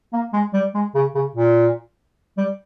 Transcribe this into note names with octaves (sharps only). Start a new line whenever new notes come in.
A#3
G#3
G3
G#3
C#3
C#3
A#2
G3